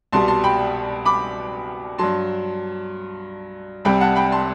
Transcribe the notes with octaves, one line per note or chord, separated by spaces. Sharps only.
C2 B2 G3 A5 C6
A5 C6
G5 B5
B5 D6
G2 F#3 A5 C6
C2 C3 G3 G5 B5
F#5 A5
G5 B5
A5 C6